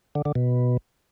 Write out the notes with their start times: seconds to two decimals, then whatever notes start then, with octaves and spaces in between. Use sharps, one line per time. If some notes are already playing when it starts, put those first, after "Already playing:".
0.15 D3
0.25 D3
0.35 B2